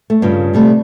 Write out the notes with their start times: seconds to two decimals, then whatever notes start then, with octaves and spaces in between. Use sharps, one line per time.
0.10 A3
0.22 G2 C#3 F4
0.53 C3 G3 A3